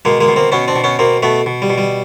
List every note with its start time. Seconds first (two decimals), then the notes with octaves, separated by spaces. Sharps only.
0.05 B2 G#3 A#3
0.21 G#3 A#3
0.28 B2
0.36 A#3 C4
0.52 B2 B3 C#4
0.68 C4 D4
0.76 B2
0.84 B3 C#4
0.99 B2 A#3 C4
1.23 B2 A3 B3
1.46 B2
1.62 G3
1.70 B2
1.78 G3